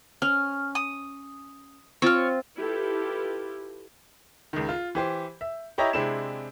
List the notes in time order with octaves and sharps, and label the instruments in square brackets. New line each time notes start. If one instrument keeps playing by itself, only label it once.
[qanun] C#4 [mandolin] F6
[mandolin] D#6
[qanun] C4 F4 [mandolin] C#5 F6
[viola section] E4 F4 G4 A4 B4
[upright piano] C#2 D#3
F4
E3 G4 C5
E5
E4 G4 C#5 D#5 E5 A#5
C3 G#3 C4 D4 E4 E7